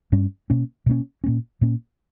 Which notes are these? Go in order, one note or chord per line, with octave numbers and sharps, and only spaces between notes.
G2 G3 C#4
B2 A#3 C#4
B2 A#3 C#4
A#2 A#3 C#4
A#2 A#3 C#4